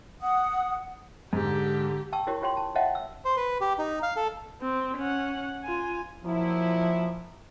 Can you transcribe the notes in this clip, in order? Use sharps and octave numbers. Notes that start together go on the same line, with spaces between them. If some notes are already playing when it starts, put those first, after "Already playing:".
F#5 D#6
G#2 D3 G4
G5 A5 C#6 E6
E4 F#4 G4 A#4 C#5
F4 G4 C#5 G5 C6
A5
C#5 D#5 E5 F#5 G5 A5
E6
C5
B4
G4
D#4
F5
A4
C4
C#4 F#5
F4 G#5
A#2 F3 F#3 E4